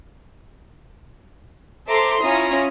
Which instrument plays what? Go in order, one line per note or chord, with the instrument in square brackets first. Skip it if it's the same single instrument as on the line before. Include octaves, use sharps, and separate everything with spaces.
[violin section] A4 C5 E5 A#5 C6 D6
C#4 E4 F4 A#5 D#6